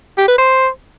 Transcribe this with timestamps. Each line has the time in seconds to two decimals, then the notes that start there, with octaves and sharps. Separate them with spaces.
0.18 G4
0.28 B4
0.38 C5